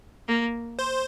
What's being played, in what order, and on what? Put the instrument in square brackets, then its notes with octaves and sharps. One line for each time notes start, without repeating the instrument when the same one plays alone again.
[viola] A#3
[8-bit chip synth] C5